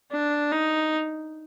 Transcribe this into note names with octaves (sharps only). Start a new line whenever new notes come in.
D4
D#4